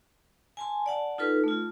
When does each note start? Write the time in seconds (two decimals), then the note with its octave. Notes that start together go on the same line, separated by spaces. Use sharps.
0.57 G#5 A5 C6
0.86 D5 F#5 A5
1.18 D#4 F4 A4 B4
1.44 A3 F4